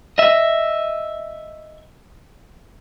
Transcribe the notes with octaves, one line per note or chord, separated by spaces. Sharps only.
D#5 E5